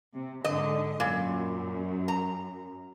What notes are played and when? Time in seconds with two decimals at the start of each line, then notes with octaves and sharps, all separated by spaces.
0.14 C3
0.44 G#2 D3 D#5
1.00 F#2 A#2
2.08 A#5